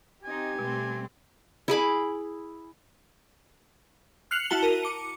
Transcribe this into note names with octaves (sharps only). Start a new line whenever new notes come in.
C4 D#4 G4 G#5
B2 G3 A3 C4
E4 G#4 B5 D6
F6 F#6 C7 C#7 F7 F#7
E4 F#4 A5 G7
A#4 D#7
D6 C#7